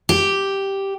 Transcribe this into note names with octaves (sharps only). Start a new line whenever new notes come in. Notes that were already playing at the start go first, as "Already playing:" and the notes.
G4